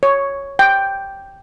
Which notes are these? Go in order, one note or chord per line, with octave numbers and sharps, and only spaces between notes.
C#5
G5